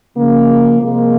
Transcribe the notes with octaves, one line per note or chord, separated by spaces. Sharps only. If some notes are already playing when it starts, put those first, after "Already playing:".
C#3 F3 G#3 A#3
C3 F3 G#3 A#3